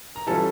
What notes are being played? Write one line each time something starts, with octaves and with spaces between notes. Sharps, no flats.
A#5
E3 G3 C#4 F4 A4 A5